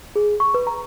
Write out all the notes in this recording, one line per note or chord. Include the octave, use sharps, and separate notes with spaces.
G#4
C#6
B4
A#5